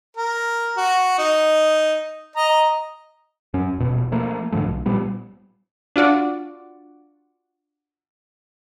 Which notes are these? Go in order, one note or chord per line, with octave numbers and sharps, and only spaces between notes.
A#4
F#4
D#4
D#5 A#5
F#2 C#4
D#1 B2
F3 A3 A#3
G#2 D3 F3 A3
B1
A#2 F3 G3 B3
D4 F4 F#4 D5